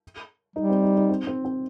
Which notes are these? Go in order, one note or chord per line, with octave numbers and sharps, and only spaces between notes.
G3 D#4
C4
D#4
D#4
C4
C4
C4